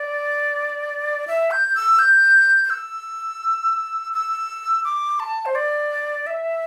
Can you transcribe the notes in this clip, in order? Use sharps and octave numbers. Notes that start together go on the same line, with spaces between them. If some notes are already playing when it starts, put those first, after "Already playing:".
Already playing: D5
E5
G6
E6
G6
G6
E6
E6
D6
A5
C5
D5
E5